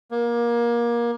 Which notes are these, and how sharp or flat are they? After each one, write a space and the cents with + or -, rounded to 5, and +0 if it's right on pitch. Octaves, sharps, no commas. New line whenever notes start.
A#3 +25